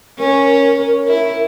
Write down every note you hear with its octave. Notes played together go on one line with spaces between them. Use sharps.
C#4 A#4
E4